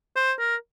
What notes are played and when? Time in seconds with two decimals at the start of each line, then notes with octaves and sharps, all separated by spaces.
0.16 C5
0.39 A#4